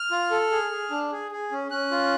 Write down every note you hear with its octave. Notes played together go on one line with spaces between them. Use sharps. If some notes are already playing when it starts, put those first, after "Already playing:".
Already playing: F6
F4
A4
G#4
G#4
D4
G#4
G#4
C#4
C#4 F#6
F4